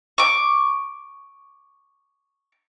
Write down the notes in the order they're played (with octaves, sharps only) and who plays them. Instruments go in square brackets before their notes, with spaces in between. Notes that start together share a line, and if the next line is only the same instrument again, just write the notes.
[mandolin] C#6 D6